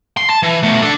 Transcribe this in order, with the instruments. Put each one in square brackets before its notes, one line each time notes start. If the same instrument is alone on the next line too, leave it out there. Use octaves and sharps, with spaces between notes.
[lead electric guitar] C6
A5
E3
B2 A3
D4 A4